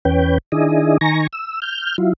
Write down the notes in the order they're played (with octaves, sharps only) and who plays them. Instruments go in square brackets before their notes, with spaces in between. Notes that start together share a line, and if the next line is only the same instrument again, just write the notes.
[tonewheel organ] E2 C#4 B4 G5
D#3 D4 E4 G#4 D#5
D#3 G#5 A#5 C#6 A#6
E6
F6 G6
F#3 E4 F4